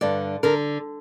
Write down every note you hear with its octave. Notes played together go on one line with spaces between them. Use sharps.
G2 D3 D5
D3 A#4